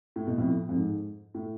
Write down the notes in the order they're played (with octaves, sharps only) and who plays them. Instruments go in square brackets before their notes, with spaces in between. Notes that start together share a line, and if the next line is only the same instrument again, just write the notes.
[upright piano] A2
B2
F2 A2
F2
G#2
A2